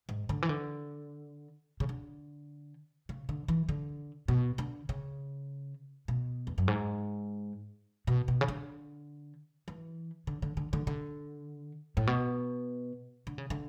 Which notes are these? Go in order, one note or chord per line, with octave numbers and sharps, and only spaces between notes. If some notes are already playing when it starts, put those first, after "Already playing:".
G#2
D3
E3
D3
C#3
D3
C#3
D3
E3
D3
B2
D3
C#3
B2
E2
F#2
G#2
B2
B2
C#3
D3
E3
D3
D3
D3
D3
D3
A2
B2
D3
C#3
D3